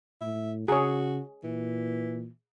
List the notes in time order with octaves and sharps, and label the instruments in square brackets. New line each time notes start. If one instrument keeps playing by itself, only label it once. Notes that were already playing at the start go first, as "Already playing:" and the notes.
[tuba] A2 [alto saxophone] E5
[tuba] C#3 [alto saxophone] F#4 [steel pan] G#4 C#5
[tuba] A#2 [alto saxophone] E3